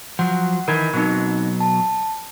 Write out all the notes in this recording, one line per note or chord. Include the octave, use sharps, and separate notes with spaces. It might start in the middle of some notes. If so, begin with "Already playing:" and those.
F3 F#3 F#5
D#3 E3 A#4 B5 G#6
B2 F#3 C4 D#4
A5